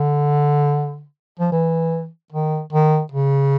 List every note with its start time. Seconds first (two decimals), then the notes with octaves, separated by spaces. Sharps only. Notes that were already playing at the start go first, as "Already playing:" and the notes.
Already playing: D3
1.40 F3
1.52 E3
2.32 D#3
2.73 D#3
3.12 C#3